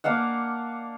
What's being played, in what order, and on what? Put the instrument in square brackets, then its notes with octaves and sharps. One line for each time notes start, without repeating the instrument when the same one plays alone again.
[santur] A#3 D4 F5 F#5